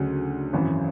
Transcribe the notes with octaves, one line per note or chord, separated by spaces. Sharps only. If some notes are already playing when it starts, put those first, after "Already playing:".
Already playing: D2 C#3 F#3
G#1 F#2 E3